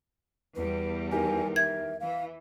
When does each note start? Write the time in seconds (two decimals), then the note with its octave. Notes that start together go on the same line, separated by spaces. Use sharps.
0.56 E2 G3 B4
1.12 D#3 G4 A#4 G#5
1.56 E5 G#6
2.00 E3 F5